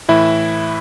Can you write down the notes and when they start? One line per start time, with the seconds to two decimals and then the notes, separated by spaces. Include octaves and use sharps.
0.08 A2 E3 E4 E5